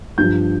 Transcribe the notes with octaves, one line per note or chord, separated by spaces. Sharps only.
G2 F3 G6